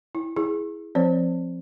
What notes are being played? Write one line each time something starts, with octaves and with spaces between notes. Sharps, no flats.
E4
E4 G#4
F3 C4 C5 C#5